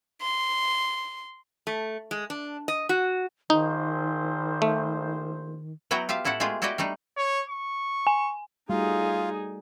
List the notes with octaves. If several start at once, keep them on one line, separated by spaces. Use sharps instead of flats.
C6
A3
G#3
D4
D#5
F#4
A#1 D#3 D#4 C5
A3
F#3 B3 E4 F#4 G5 A#5
F4 G4 E5 F5
A2 E4 F#4 A4 F#5
G#3 A3 B3 F4 G4 G#4
E4 F#4 G4 D5 D#5 G5
G3 A3 D4 D#4
C#5
C#6
G#5
G3 A3 D#4 F4 F#4 G#4